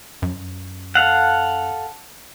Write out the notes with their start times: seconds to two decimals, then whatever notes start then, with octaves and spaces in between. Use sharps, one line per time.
0.22 F#2
0.95 A4 F5 F#5